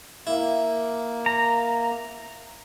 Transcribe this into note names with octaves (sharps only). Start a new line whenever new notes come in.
A#3 E4
A#5